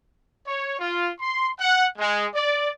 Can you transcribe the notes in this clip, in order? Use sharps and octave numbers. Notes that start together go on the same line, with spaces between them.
C#5
F4
C6
F#5
G#3
D5